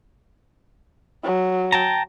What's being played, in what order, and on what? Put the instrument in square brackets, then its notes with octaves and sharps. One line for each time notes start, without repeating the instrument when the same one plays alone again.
[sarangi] F#3
[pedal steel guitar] G5 A5 A#5